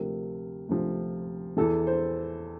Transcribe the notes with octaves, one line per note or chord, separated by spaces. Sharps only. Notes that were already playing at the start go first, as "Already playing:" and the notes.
Already playing: D2 C3 F3 A#4
D2 C3 F3
E2 E3 A4
C5